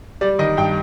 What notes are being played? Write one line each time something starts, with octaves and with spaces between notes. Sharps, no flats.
G3 D5
D#3 D#5
G2 G5